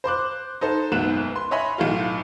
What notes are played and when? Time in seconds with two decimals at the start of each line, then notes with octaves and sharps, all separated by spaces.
0.04 C5 C6 D6 F#6
0.61 D#4 A4 C5
0.92 F#1 B1 G#2 B3 F#6 E7
1.36 C6
1.51 C#5 D#5 E5 G#5 B5 C6
1.78 B1 A2 A3 F4